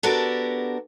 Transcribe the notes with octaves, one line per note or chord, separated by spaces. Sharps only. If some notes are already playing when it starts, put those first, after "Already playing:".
B3 D4 F#4 G4 A4 A#4